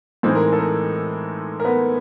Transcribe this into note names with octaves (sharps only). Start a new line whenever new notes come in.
A2 E3 G#3 C4 D#4 C5
A#4
A4
A#4
A#4
B3 B4